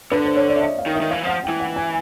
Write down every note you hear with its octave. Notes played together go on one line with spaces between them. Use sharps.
D3 B4
C5
C#5
D5
E5
D#5
F5
D#3
E5
D#3
E3 F5
F3 F#5
G5
E3
F#5
G#5